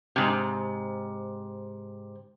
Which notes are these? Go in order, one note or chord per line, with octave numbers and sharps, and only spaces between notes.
G#2 C3